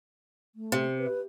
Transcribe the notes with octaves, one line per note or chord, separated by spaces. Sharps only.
A3
C3
B4